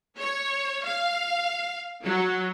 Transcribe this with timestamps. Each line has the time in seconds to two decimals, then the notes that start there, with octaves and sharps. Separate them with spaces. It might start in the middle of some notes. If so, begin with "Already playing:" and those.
0.19 C#5
0.85 F5
2.03 F#3